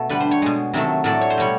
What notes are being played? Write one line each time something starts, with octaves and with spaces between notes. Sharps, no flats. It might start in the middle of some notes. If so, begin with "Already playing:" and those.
Already playing: B2 A3
D3 G3 B4
C5
C#5
B2 G#3
C3 D#3 F#3 A3
A2 F#3 A3 D5
C#5
C5
B2 G3 C#5